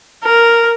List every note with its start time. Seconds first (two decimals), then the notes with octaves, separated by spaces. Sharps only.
0.24 A#4